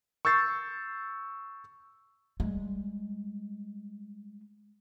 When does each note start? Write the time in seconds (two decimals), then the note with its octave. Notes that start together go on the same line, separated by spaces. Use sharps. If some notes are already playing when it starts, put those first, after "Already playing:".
0.25 C#6 E6 G6 A6 C7
2.40 G3 G#3